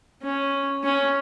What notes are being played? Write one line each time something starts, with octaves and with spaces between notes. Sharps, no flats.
C#4
C#4